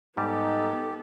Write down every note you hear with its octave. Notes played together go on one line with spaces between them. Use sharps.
G#2 G3 B3 D#4 G4 A4